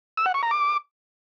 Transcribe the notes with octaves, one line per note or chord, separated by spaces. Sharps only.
E6
F#5
C#6
A#5
D6